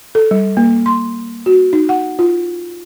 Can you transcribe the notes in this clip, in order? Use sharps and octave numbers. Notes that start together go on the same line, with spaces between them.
A4
G3
A#3
C6
F#4
D#4
F#5
F4